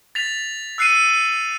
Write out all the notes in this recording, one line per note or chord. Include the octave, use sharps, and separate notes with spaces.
A6 B6 F7
E6 F#6 C7 C#7 D#7